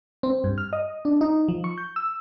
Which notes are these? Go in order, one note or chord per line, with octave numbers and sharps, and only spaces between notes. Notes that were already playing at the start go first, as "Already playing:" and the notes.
C4
G2
F6
D#5
D4
D#4
F3
C#6
G6
E6